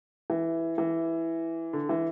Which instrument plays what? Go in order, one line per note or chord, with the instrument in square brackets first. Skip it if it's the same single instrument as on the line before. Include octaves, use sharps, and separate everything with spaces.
[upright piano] E3
E3
D3
E3